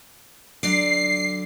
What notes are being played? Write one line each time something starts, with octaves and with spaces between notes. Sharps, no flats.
D3 F#3 D5 C7